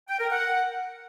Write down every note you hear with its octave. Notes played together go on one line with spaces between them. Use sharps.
G5
A#4
F#5